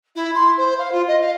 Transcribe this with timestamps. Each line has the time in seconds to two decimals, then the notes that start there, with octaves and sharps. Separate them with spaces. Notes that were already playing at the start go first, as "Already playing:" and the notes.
0.15 E4
0.35 C6
0.57 C5
0.78 F5
0.92 F4
1.08 D#5
1.21 F5